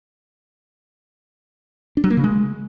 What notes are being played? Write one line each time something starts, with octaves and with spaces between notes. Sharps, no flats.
D4
F#3
A#3
C#3
G#3